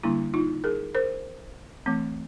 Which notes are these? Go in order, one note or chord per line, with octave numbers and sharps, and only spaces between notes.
D3 G3 A#3 D4 E4
D#4 F4
G#4 A#4
A#4 C5
E3 A3 C4